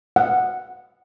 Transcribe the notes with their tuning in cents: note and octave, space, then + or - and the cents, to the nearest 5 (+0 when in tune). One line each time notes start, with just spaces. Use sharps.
F#5 +0